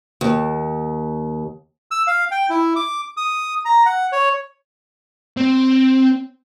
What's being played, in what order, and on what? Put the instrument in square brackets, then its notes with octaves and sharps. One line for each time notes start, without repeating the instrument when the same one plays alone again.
[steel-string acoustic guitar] D#2
[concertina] E6
F5
G5
E4
D6
D#6
A#5
F#5
C#5
[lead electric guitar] C4